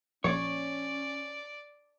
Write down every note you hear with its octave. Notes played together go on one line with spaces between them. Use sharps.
A#1 C#4 C#5 D5